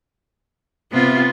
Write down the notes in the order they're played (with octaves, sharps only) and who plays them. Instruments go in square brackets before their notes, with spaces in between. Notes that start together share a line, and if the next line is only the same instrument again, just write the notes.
[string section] C3 [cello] B3 F4